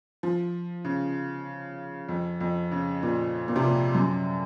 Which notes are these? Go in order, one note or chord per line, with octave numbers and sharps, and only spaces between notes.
F3
C#3
F2
F2
C#3
A#2
A#2
C3
A#2
F#2